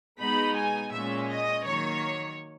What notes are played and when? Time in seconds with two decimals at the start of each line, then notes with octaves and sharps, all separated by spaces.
0.20 B2 G#3 B3 D#4 B5
0.56 G#5
0.92 A#2 G#3 C#4 E5
1.29 D#5
1.65 D#3 F#3 A#3 C#5